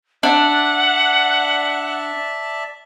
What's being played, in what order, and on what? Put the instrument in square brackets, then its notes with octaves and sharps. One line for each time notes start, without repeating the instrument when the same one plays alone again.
[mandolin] D4 [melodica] D5 E5 A5 [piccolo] F#5